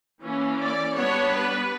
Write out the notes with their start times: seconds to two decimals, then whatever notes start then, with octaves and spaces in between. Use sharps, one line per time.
0.22 E3 A#3 C#4
0.59 D5
0.96 G3 B3 D4 C#5
1.34 B4